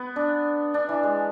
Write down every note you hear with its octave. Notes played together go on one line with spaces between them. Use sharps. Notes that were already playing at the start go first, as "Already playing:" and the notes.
Already playing: B3
D4
D4
E3
G#3